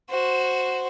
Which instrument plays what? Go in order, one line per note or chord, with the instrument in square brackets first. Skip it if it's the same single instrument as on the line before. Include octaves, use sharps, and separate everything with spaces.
[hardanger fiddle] F#4 C5